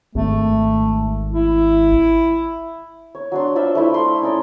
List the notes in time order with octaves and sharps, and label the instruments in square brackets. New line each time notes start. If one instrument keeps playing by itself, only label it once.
[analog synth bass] G#1 [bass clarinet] A3
[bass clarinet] E4
[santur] C#5
F#3 D4 C6
F4 C5 D5 E5
A3 E4
C6
C#4 D#4 D5